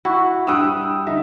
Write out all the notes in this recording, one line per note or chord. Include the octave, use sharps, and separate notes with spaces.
E4 F#4
G2 G3 F#5 G5 D#6 E6
D3 D#4 E5